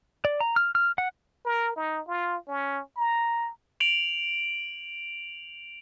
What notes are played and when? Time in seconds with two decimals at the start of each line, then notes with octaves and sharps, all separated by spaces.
0.25 D5
0.40 A#5
0.56 F6
0.75 F6
0.98 F#5
1.45 A#4
1.76 D#4
2.08 F4
2.48 C#4
2.97 A#5
3.80 D7 F7 F#7